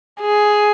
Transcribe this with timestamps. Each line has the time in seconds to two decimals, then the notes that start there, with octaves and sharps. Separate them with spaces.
0.21 G#4